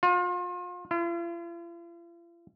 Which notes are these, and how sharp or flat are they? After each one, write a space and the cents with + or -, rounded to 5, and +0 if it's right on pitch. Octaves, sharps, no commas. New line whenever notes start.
F4 +35
F4 -45